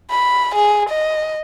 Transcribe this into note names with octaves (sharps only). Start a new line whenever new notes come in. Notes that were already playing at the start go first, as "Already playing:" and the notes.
B5
G#4
D#5